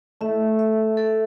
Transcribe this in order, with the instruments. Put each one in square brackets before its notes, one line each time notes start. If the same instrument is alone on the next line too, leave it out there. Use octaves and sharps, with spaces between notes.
[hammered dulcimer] A3 [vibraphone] E5
[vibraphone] E5
A4